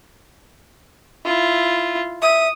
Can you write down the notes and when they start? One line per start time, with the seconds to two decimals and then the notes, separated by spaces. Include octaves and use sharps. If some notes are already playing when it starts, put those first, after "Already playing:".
1.25 E4 F4
2.22 E5 D#6